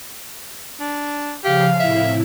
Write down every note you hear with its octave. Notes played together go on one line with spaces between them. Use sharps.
D4
C#3 F3 G4 F5
A2 C3 E4 E5